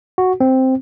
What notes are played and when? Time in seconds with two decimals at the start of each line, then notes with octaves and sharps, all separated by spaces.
0.18 F#4
0.40 C4